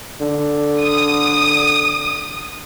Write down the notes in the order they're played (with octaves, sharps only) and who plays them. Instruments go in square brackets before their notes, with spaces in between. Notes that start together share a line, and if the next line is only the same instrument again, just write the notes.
[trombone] D3
[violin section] D#6